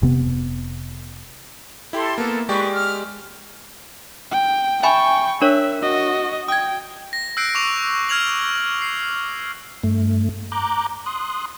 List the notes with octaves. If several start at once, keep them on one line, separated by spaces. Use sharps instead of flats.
F1 C3 B3
E4 G4 A4 C6
A#3 B3 A4
G#3 G4 B4 D5 C#6
F6
G5
E5 G5 G#5 B5 C#6
D4 A#4 C#5 E5
F#4 D#5
G5 D#6 G#6
A#6
E6 F#6 G6 C7 D7
C#6 D6 F7
F6 G#6 F7 F#7
C7
G2 A3
A#5 D6 F#6 G6
C6 D#6 F#6